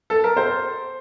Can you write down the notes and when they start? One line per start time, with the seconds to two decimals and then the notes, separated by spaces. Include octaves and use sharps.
0.10 A4
0.24 A#4
0.37 C5